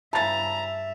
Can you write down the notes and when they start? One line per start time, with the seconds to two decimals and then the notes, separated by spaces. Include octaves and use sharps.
0.13 G2 C#3 E3 E5 A5 A#5 A6